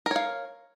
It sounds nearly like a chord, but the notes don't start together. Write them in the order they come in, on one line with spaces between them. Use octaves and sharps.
A#4 C#5 F5